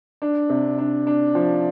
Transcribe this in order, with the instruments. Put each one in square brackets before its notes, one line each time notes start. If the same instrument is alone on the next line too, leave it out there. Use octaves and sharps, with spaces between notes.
[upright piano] D4
C3
D4
D4
F3